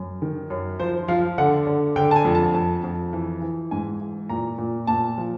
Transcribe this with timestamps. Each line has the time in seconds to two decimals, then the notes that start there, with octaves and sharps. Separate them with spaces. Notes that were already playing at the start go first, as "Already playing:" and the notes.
Already playing: F#2
0.22 D#3
0.50 F#2
0.80 F3 C5
1.08 F3 F5
1.38 D3 F#5
1.67 D3
1.96 D3 G5
2.11 A5
2.16 G#5
2.25 F2
2.35 A5
2.54 F2 A5
2.84 F2
3.13 E3
3.42 E3
3.71 G#2 G#5
4.00 E3
4.29 A#2 A#5
4.58 A#2
4.87 A#2 A5
5.18 F3